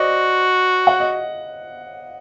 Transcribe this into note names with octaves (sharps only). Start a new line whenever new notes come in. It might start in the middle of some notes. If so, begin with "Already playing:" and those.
Already playing: F#4 C5 D5 D#5
F#5
D#5